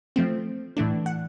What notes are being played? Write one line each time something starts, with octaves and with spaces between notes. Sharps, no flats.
F3 A3 C4
A2 E3 A3 D4
F#5